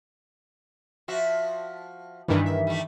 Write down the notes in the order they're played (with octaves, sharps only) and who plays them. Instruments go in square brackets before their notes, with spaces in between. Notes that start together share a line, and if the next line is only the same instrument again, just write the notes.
[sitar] F3 F#4 E5
[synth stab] G2 D#3 E3 [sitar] G3 B3
[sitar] E5
G3 A3